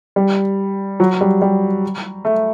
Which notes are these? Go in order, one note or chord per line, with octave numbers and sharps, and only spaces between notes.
G3
F#3
G3
G3
A3